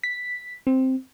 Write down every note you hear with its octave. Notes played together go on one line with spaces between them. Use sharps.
B6
C4